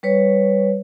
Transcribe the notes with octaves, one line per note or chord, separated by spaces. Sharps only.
G3 B4 C#5